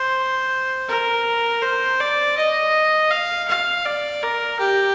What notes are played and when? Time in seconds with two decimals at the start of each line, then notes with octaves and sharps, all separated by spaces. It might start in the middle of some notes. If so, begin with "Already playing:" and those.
Already playing: C5
0.89 A#4
1.62 C5
2.00 D5
2.37 D#5
3.11 F5
3.48 F5
3.86 D5
4.23 A#4
4.59 G4